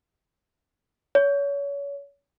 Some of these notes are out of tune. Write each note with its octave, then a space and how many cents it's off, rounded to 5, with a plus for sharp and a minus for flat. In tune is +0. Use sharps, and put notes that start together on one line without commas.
C#5 +30